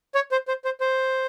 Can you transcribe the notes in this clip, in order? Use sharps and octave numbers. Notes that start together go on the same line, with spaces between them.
C#5
C5
C5
C5
C5